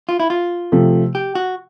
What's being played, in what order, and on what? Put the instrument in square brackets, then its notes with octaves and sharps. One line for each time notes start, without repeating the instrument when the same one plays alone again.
[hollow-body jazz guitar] F4
E4
F4
[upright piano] C3 F3 A3
[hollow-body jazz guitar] G4
F#4